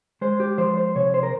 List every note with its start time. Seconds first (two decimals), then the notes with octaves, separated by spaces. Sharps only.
0.21 G#3 C5
0.40 G4
0.58 F3 C5
0.77 C5
0.95 C3 C#5
1.14 C5
1.23 A#4